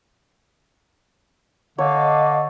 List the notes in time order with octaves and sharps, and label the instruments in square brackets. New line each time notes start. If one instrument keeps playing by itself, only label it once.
[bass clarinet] D3 [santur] C#5 [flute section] D#5 F5 D6